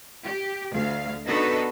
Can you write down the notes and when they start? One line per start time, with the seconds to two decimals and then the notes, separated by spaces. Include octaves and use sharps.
0.23 G4
0.71 D2 F5
1.27 B3 D4 D#4 F#4 A4 B4